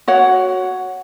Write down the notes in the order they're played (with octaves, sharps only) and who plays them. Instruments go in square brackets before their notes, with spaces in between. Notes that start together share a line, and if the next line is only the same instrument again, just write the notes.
[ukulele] F#4 C#5 F#5